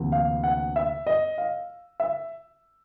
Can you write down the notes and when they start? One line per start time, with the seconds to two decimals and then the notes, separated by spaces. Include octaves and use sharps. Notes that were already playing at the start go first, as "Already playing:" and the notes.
Already playing: D2 C3 E3 A#3
0.12 F5
0.44 F#5
0.76 E5
1.07 D#5
1.38 F5
2.00 E5